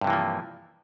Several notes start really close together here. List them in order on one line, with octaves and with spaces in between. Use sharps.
G2 C3 E3 A#3 F3